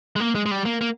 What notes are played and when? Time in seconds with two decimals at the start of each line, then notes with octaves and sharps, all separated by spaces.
0.16 G#3
0.20 A#3
0.35 G#3
0.46 G#3
0.51 G3
0.65 A#3
0.81 A#3